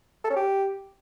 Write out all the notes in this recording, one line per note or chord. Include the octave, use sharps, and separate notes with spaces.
A4
C#4
G4